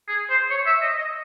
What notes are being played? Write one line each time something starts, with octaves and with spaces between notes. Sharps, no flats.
G#4
C5
C#5
E5
D#5
D#5